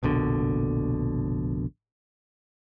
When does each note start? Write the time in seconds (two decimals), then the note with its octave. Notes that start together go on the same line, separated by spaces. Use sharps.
0.03 F1 A#1 B2 D3